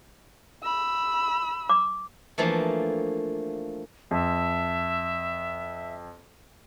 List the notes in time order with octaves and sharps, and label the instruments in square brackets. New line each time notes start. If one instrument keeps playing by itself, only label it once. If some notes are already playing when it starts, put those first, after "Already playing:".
[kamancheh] B5 E6
[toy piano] D6
[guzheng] E3 F3 A3 A#3 D4
[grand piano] F2 [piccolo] E5